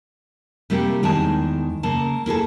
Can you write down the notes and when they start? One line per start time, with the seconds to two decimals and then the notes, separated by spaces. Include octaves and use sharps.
0.70 C3 G3 A3 A#3 C4 G4
1.03 E2 D#3 G#3 G#5 A5
1.83 C#3 A3 A#3 A5
2.26 A#3 E4 G#4 A4